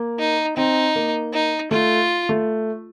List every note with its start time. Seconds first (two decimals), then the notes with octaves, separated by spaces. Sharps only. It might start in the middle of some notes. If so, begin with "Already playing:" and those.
Already playing: A#3
0.19 D#4
0.57 C4 D#4
0.96 A#3
1.33 D#4
1.71 A3 F4
2.29 A3